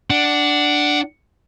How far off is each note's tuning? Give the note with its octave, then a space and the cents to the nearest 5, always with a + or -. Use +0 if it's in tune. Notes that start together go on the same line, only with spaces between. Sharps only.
D4 +0 F#5 +20